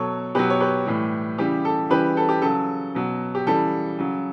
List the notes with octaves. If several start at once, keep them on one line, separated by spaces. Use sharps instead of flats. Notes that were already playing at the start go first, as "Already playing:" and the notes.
Already playing: B2 F#3 A4 C#5
B2 F#3 G4 B4
C#5
G4 B4
A2 E3 G3
C#3 E3 G3 G4
A4
C#3 E3 G3 G4 B4
A4
G4
C#3 F#3 A4
B2 F#3
G4
C#3 E3 G3 A4
C#3 F#3